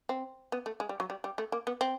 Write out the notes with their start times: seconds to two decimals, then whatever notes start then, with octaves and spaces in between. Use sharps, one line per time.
0.09 C4
0.52 B3
0.66 A3
0.80 G#3
0.89 G3
1.00 F#3
1.10 G3
1.24 G3
1.38 A3
1.52 A#3
1.67 B3
1.81 C4